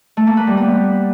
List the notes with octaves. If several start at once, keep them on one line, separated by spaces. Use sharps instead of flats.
A3
A#3
B4
G3
B3